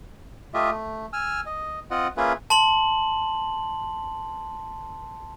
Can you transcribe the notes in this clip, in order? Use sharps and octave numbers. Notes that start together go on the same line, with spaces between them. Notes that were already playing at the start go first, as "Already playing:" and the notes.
A3 F4 G4 D#5 E5
A3
G#5 E6 F6
D#5
C4 F4 D#5 F#5
A#3 C#4 F4 G#4 B4 E5
A5 C6 F#7